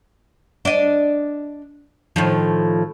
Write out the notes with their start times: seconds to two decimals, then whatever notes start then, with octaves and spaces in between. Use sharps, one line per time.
0.65 D4 D#5
2.16 A2 D#3 F3